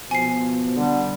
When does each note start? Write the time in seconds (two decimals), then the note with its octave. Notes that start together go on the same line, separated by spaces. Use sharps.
0.11 B2 F3 G#5 C7
0.76 D3 G3